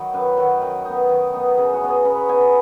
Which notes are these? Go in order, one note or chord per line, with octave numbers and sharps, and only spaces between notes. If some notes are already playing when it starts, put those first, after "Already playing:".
Already playing: D#3 F#3 D#4 B5
F#2 B4
D#3 F#3 F#4
D#3
B3 D#4
D#3
B3 D#4
C#3 G#4
F#4
B3 D#4
G#4
C#3 B4
C#5
B3 D#4 G#5
B5